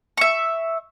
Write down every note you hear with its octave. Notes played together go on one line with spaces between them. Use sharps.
E5 C#6